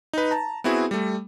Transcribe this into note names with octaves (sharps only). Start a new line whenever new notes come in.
D#4 B4
A5 A#5
B3 C4 E4 F#4 G#4
G3 A3